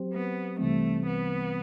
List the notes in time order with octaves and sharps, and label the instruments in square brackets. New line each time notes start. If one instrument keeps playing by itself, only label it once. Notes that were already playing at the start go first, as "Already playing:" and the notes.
Already playing: [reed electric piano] F#3 C4 G4 C5
[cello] B3
[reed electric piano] C2 C3 E3 G3 C4 [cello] A3
[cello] B3